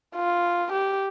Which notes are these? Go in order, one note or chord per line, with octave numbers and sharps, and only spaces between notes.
F4
G4